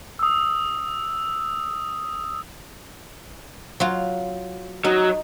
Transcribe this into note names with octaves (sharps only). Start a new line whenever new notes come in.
D#6 E6
F#3 F4
F#3 D#4